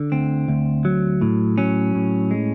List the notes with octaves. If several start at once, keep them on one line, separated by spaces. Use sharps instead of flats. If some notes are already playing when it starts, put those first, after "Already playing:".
Already playing: D3
D2 C4
D2
F#3
A2
F#3 C#4
A2
G#3